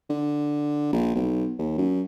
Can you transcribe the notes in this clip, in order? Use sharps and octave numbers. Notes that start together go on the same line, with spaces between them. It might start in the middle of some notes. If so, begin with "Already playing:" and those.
D3
A#1
B1
D#2
F#2